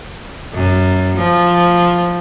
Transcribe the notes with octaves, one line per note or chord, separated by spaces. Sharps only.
F#2
F3